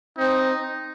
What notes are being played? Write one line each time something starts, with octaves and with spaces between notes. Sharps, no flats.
C4 D#4